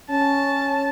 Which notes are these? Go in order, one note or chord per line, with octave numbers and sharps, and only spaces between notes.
C#4 A5